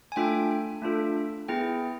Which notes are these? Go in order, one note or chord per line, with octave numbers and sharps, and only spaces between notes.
G#5
A3 D4 F4 A4 G5
A3 D4 F4 A4
B3 E4 G#4 G5